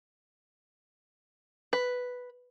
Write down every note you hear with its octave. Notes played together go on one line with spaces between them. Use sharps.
B4